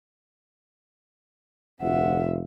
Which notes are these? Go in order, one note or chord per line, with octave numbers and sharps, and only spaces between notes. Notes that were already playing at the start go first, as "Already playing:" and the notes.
F1 D2 C4 F4 E5 F#5